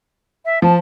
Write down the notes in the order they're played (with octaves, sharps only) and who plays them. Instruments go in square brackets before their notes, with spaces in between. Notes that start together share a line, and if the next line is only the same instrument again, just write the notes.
[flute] E5
[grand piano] F3 [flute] A5